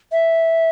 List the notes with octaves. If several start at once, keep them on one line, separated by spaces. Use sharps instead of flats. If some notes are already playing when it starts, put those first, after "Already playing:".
E5